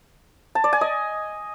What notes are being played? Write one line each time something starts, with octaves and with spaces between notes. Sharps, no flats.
A5
D5
G#5
D#5